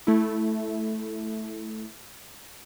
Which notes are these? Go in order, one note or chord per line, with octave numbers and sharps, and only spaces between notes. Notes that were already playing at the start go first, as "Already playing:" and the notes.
A3 E4